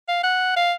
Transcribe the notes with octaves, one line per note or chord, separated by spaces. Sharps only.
F5
F#5
F5